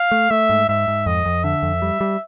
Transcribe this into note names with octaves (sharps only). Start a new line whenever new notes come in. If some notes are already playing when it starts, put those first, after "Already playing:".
Already playing: F5
A3
A3 E5
G#2
G#2 E5
G#2
F2 D#5
F2
D3 E5
F2
G3
G3